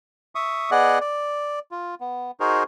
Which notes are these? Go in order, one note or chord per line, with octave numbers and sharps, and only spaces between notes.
E5 C#6 D#6
B3 G#4 D5 D#5 F#5
D5
F4
B3
D#4 F#4 G#4 A#4 C5